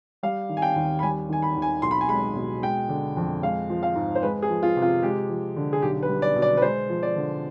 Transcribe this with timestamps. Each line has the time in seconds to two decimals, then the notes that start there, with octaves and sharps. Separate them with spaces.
0.23 G3 F5
0.49 D#3
0.57 G#5
0.62 G5
0.76 D#2
0.99 B5
1.03 G3 G#5
1.29 D#3 G#5
1.42 B5
1.56 D#2
1.62 G#5
1.82 B1 C6
1.91 B5
2.01 G#5
2.09 G#3 B5
2.36 B2
2.62 G#3 G5
2.89 D3
3.17 F2
3.42 G#3 F5
3.70 F3
3.83 F5
3.95 G#2
4.15 C5
4.23 G#3 B4
4.43 G#4
4.50 F3
4.63 F4
4.77 C3
4.82 F4
5.03 G#3 G4
5.30 F3
5.56 D3
5.73 G#4
5.82 B1 G4
6.03 B4
6.09 G3
6.22 D5
6.36 B2
6.42 D5
6.57 B4
6.62 G#3 C5
6.90 F3
7.03 D5
7.16 D3